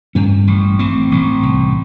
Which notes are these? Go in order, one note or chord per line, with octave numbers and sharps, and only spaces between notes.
G2 C#4
A1
A1 C4
A1
C2